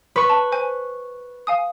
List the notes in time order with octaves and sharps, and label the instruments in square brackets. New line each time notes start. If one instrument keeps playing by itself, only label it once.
[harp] B4 C#6
[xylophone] A5
C5 G#5
F5 G#5 D#6